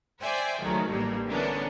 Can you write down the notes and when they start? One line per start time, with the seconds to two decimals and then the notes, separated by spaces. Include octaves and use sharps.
0.22 C5 D5 E5 G5 G#5
0.60 C#2 D#3 F3 F#3 G#3 A3
0.90 A1 G2 G3 A#3
1.27 D3 E3 A#3 B3 C#4 D4